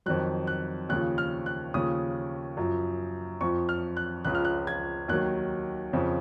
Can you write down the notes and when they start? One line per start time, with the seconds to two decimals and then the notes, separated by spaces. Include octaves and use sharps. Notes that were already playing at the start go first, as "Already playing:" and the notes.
0.06 F2 D#3 F#3 F#6
0.47 F#6
0.89 D#2 C#3 F3 F#6
1.18 F6
1.46 F#6
1.74 D#2 C#3 F3 D#6
2.57 F#2 F3
3.41 F2 F3 C#6
3.69 F6
3.97 F#6
4.25 C#2 C#3 F3 F#6
4.35 F6
4.45 F#6
4.67 G#6
5.08 D#2 D#3 F#3 F#6
5.93 F2 C#3 F3